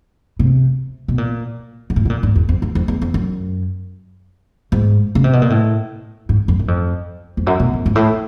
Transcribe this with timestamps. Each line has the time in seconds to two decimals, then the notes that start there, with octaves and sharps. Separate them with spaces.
0.39 C3
1.08 B2
1.18 A#2
1.90 G#2
1.96 A2
2.05 B2
2.10 A#2
2.23 G#2
2.36 E2
2.49 F2
2.62 E2
2.75 F2
2.88 E2
3.02 F2
3.14 F#2
4.72 G#2
5.15 C#3
5.24 C3
5.33 B2
5.42 A#2
5.50 A2
6.29 G#2
6.48 F#2
6.59 F#2
6.68 F2
7.37 F2
7.46 F#2
7.60 B2
7.73 F2
7.86 G#2
7.95 A2